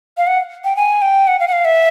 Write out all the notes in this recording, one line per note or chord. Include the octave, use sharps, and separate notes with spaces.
F5
F#5
G5
G#5
G5
F#5
F5
F#5
F5
E5